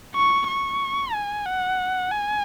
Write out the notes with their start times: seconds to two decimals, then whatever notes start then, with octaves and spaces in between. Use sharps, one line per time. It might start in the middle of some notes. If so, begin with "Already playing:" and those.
0.15 C#6
0.48 C#6
1.14 G#5
1.46 F#5
2.11 G#5